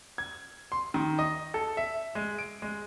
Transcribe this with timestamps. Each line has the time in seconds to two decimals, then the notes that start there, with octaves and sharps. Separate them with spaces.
0.18 G#6
0.72 C6
0.94 D#3
1.19 D#5
1.54 A4
1.77 E5
2.15 G#3
2.39 D7
2.62 G#3